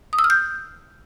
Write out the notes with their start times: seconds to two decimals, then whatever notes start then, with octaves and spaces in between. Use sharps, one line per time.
0.13 D#6
0.19 E6
0.24 F6
0.30 G6